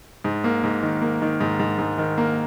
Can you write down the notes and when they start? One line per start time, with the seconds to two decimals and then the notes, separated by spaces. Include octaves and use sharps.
0.24 G#2
0.44 A#3
0.63 G#2
0.83 D#3
1.02 A#3
1.22 D#3
1.40 G#2
1.59 G#2
1.79 G#2
1.98 D#3
2.18 A#3